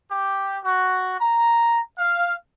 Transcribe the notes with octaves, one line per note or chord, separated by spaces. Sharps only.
G4
F#4
A#5
F5